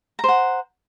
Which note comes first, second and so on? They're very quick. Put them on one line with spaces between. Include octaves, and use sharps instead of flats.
A#5 C5 F#5